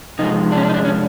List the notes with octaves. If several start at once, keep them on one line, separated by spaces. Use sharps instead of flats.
C3 F3 G#3 D#4
D4
C#4
D4
D#4
D4
C#4